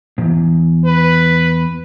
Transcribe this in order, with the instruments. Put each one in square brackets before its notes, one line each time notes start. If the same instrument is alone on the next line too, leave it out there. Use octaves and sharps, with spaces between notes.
[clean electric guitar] E2 G#2
[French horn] B4